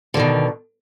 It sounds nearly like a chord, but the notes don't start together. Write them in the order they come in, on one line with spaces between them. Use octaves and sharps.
D3 D#3 B2